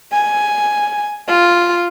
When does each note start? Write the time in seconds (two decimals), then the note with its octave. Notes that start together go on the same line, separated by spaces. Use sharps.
0.12 G#5
1.28 F4